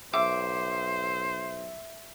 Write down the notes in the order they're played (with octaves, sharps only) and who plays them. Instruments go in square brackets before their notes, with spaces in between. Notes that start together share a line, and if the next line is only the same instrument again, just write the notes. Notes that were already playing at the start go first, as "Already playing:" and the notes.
[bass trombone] B1 [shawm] C5 [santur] E5 [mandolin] D6